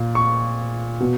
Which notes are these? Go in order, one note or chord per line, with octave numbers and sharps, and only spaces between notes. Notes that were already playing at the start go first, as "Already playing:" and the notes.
Already playing: A#2
C#6
B2